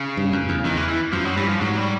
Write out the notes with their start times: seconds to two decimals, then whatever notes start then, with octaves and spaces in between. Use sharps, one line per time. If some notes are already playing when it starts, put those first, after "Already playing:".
Already playing: C#3
0.17 G2
0.33 F#2
0.49 E2
0.65 E2 D#3
0.77 E3
0.89 E3
1.13 F#2 F3
1.25 F#3
1.37 G2 E3
1.49 F3
1.61 G#2 F#3
1.77 G3